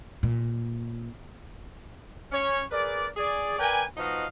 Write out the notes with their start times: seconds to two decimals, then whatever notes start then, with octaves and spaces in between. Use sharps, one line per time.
0.23 A#2
2.31 C#4 C#5
2.71 G#4 A#4 B4 D5
3.16 G#4 D5
3.58 A#4 B4 D5 G5 G#5
3.97 F3 B3 D#4 F#4 D#5 F5